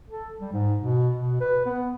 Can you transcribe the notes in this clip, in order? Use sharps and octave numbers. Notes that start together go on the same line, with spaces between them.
A4
G3
G#2
B2
B2
B4
B3